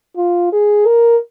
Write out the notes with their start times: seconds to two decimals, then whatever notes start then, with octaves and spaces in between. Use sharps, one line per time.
0.17 F4
0.52 G#4
0.86 A#4